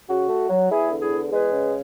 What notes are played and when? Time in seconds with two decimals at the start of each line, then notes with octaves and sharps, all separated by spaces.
0.08 C#3 F#4
0.29 A3
0.49 F#3
0.70 E2 E4 G#4
0.89 D3
1.00 E4 G#4
1.10 E2
1.30 G#3 G#4 B4
1.51 C#3